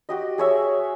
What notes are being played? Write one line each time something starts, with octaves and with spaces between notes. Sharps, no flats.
F#4 G4 D#5
G#4 C#5 E5